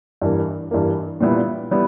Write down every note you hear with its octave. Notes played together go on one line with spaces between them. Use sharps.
G2 E3 A#3
G2 E3 A#3
A#2 G3 B3 E4
G3 B3 E4